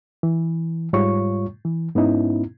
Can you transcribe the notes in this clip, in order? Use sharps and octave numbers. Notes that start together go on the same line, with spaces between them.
E3
G#2 G3 F4 C#5 C#6
E3
G#2 B3 C#4 D#4 E4